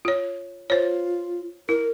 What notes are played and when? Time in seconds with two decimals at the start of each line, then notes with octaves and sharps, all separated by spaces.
0.05 F4 C#5
0.70 F4 C5 C#5
1.69 E4 A#4